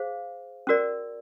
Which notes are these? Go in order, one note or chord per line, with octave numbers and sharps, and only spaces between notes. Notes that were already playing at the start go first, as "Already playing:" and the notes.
Already playing: G#4 C5 F5
C#4 F#4 A#4 D5